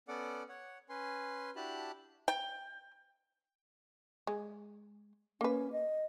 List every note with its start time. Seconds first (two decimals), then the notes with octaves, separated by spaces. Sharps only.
0.08 B3 C#4 A4 D5 F#5 D6
0.49 C#5 F#5
0.89 C#4 B4 G#5 C6
1.56 D4 E4 F#4 G4 A5 B5
2.28 G5
4.27 G#3
5.41 A#3 C#4 B4
5.72 D#5